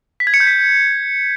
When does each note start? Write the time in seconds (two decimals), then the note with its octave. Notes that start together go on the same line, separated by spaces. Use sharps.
0.20 B6
0.27 G#6
0.34 C#7
0.40 G6
0.47 B6